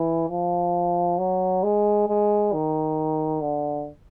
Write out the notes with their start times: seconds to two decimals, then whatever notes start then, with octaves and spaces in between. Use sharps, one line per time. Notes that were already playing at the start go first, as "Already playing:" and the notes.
Already playing: E3
0.29 F3
1.19 F#3
1.63 G#3
2.08 G#3
2.53 D#3
3.42 D3